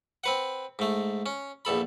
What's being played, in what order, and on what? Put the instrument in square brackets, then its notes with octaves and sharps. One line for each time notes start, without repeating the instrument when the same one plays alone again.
[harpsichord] C4 B4 F#5
G#2 A3
C#4
A#1 E2 A4 B5